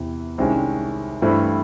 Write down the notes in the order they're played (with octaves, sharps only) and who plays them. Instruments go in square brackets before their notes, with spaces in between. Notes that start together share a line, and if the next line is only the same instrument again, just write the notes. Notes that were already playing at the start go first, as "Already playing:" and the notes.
Already playing: [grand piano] E2 C3 E3
C2 C3 D#3 G#3 C#4
G2 E3 A3 C4 E4